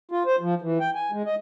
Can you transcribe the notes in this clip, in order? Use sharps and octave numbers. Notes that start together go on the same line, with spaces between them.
F4
C5
F3
E3
G5
G#5
G#3
D#5